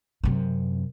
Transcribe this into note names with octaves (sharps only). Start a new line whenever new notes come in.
F#2 C3